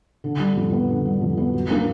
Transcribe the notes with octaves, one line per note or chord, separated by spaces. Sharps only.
D3
G3
F2
B3
D3
G3
F2
B3
F#3
A#3